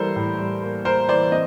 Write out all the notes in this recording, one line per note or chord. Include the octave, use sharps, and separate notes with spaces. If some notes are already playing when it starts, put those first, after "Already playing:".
Already playing: E3 G3 A#3 A4 A#4 C5
A2
G3
A#3
A#3 A#4 C5
E3 C5 D5
C4 D#5